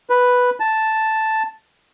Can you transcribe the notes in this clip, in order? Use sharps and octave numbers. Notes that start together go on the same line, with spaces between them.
B4
A5